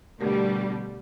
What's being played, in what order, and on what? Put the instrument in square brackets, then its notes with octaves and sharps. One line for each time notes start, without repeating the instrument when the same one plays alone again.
[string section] B2 D3 G3 [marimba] A3 G4 A#4